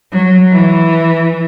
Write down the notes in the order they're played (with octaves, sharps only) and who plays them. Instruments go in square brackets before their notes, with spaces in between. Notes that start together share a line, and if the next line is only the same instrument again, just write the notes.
[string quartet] F#3
E3